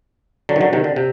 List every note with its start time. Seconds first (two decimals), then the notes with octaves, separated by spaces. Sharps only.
0.49 D3 F#3
0.56 D#3
0.61 D3 F#3
0.73 C3 D#3
0.84 D3
0.96 C3